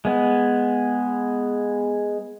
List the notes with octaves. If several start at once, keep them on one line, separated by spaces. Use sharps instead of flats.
G#3 B3